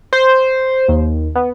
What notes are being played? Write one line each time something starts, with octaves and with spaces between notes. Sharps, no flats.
C5
D#2
B3